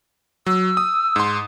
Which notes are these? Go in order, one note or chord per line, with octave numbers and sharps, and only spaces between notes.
F#3 E6
D#6
G#2 C6